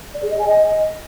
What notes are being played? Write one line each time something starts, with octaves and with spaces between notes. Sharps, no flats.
D5
G#4
D#5
G#5
D#5